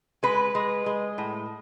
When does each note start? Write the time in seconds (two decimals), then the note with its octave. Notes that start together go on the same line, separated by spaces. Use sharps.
0.23 G#3 B4
0.55 G#3
0.86 G#3
1.18 A2